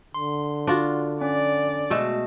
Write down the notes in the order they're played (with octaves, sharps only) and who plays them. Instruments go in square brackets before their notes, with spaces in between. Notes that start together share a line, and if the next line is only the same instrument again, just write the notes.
[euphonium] D3 [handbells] C6
[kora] D4 F4 F#4
[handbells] C#4 [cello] D5
[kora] B2 G#3 A3 [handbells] F#4 D#5